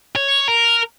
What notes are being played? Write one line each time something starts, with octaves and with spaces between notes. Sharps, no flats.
C#5
A#4